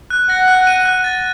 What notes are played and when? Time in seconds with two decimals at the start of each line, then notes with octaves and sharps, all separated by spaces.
0.10 F#6
0.29 F#5 A#6
0.48 F#6
0.67 D#7
0.86 F#6
1.04 A6